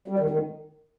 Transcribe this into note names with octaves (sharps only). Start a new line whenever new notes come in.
G3
D#3
D#3